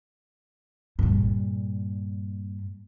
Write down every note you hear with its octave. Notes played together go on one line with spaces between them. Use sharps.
G2 A#2